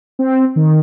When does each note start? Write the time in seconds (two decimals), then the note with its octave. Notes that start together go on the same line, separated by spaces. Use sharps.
0.19 C4
0.56 D#3